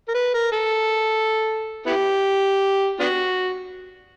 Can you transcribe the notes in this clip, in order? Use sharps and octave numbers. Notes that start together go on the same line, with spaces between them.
A#4
B4
A#4
A4
B3 E4 G4
B3 D4 F#4